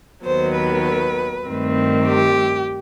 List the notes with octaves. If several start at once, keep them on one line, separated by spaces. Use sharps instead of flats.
D#2 D#3 F#3 B3 C5
B4
G2 D#3 A3 C4
G4